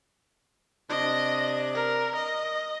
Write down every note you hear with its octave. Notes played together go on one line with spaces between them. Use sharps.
C3 D4 D#5
A#4
D#5